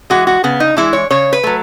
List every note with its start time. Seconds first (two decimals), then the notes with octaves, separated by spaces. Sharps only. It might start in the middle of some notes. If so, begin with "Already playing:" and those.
0.10 E3 G#3 F#4
0.27 F#4
0.44 C#3 B3
0.60 D#4
0.77 E3 G#3 E4
0.93 C#5
1.10 C#3 C#5
1.33 B4
1.43 F#3 A3